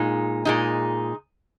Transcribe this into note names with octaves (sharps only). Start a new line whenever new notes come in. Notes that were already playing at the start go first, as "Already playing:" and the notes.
Already playing: A#2 G#3 D#4
A#2 G#3 D#4